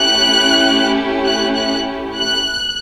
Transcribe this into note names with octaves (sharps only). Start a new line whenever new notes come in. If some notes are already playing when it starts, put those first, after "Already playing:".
Already playing: A3 C#4 E4 G4 F#6
F#6
F#6
F#6